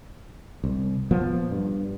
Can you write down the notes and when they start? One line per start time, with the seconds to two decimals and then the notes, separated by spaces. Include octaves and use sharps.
0.64 C2
1.11 A#2 F3 B3
1.51 G2